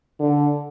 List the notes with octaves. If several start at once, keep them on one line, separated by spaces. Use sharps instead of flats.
D3